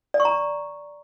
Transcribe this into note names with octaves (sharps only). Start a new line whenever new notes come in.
D5
C#6
A#5